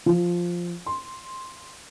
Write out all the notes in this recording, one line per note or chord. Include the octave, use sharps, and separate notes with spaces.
F3
C6